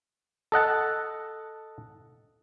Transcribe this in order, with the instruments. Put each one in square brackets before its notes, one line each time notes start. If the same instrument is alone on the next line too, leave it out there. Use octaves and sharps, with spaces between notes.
[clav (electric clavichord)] A4 D#5 F#5 A5